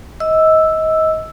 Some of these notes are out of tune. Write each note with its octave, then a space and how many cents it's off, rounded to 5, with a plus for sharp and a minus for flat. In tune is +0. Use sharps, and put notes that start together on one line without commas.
D#5 +30 E6 +0